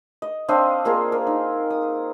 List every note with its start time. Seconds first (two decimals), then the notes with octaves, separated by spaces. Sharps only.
0.22 D#5
0.48 C4 D4 D#5 F5
0.85 A#3 F4 G#4 A#4
1.12 A#4
1.27 D#4
1.70 D#6